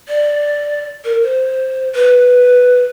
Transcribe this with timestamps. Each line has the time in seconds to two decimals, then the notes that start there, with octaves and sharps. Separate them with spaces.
0.09 D5
1.05 A#4
1.22 C5
1.95 B4